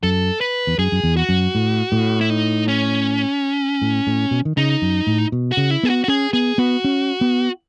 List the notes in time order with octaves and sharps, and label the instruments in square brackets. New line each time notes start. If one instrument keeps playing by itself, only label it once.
[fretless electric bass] F#2 [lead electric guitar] A4
[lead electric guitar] B4
[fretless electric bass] E2
[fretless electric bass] F#2 [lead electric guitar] G#4
[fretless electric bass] F#2
E2
[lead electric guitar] F#4
[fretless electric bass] F#2
A2
A2
[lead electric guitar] E4
D#4
C#4
[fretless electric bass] A2
A2
B2
D#3
[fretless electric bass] C#3 [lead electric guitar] D#4
[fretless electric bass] F#2
A2
B2
[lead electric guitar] F#4
[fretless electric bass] C#3
[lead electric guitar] E4
[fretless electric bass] B3 [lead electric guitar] G#4
[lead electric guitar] F#4
F#4
[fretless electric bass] C#4 [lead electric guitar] G#4
[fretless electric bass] B3 [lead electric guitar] G#4
[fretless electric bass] B3 [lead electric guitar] F#4
[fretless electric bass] C#4
B3